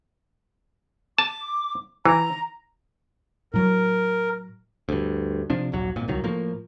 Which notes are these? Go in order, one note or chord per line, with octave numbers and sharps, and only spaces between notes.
A5 D6
E3 A#5
A2 F#3 A#4
D2 G2
C3 F3 D4
D#1 A#1 F#3
G#1 A#2
D1 C2 D#3 F#3
A2 F3 A#3